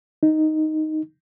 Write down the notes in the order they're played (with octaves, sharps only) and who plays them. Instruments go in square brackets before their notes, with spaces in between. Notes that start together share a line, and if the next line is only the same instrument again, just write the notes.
[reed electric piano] D#4